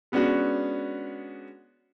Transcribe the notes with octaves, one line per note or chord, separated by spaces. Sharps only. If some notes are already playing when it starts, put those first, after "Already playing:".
G#3 B3 C#4 D4 F#4